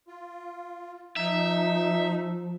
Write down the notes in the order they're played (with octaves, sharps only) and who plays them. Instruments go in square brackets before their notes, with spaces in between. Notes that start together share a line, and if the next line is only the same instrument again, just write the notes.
[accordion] F4
[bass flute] F3 [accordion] D#4 [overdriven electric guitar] E5